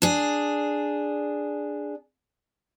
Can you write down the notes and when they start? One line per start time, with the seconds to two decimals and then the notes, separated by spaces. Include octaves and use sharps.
0.02 D4 G#4